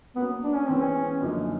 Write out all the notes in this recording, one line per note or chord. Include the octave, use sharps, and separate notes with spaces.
F#3 A#3 B3 C#4
D4
C#4
E3 G#3 B3 C4
C#4
F#2 D3 F3 A#3 D#4